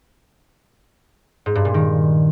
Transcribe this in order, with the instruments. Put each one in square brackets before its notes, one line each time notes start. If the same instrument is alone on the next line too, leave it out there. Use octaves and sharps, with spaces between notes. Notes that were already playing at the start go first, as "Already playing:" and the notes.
[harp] G#2
G2
A#2
D#3